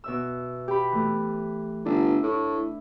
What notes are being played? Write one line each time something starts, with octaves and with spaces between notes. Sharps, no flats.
B2 E5 E6
G4 B5
E3 A3
G1 D4 E5
A2 E4